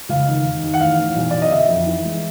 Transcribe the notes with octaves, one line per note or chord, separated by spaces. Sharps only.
C#2 F5
D#3
D#2
D#2
F#5
A1 F5
A1
B1
B1 D5
D#5
D3 E5
F2
E3
G#3